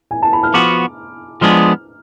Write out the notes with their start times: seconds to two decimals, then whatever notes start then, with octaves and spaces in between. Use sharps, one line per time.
0.11 G#5
0.22 A5
0.33 B5
0.43 F6
0.54 F3 B3 F#4 D6
1.41 F3 G#3 B3 D4 G#4 F6